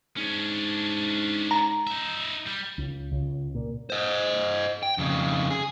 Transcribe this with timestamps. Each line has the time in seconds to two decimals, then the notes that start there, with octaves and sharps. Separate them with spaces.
0.17 G#2 C#4 D4
1.51 A#5
1.87 D#4 E5
2.47 G3
2.78 C#2
3.12 C#2
3.55 A#2
3.90 C5 D#5
4.83 G5
4.98 F2 C#3
5.50 G#4